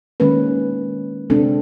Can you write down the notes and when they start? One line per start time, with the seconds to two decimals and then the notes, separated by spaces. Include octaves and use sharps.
0.20 D#3 G#3 A#3 C#4 B4
1.30 C3 G#3 C4 D4 A4